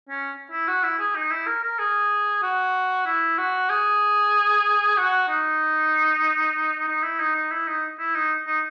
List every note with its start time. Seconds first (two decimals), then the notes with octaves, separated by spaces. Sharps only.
0.09 C#4
0.52 E4
0.68 F#4
0.83 E4
0.99 G#4
1.16 D#4
1.31 E4
1.47 A#4
1.63 A#4
1.79 G#4
2.43 F#4
3.06 E4
3.38 F#4
3.69 G#4
4.97 F#4
5.28 D#4
6.88 D#4
7.03 E4
7.19 D#4
7.35 D#4
7.51 E4
7.67 D#4
7.99 E4
8.15 D#4
8.47 D#4